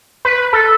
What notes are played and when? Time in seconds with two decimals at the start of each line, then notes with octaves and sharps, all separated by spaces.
0.25 B4
0.53 A4